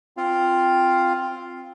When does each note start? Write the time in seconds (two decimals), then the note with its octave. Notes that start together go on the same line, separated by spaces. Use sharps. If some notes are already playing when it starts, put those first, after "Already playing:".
0.17 C4 F4 F5